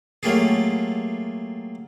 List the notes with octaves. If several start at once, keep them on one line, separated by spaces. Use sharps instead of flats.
F#3 A3 A#3 F4 G4 G#4